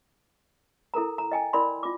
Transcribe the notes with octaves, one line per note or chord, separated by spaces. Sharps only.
E4 A4 A#4 A#5
A#5
D#5 G5 G#5
E4 A#4 D5 B5 C6
F4 D6